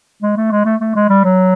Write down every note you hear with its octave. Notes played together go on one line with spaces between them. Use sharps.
G#3
A3
G#3
A3
A3
G#3
G3
F#3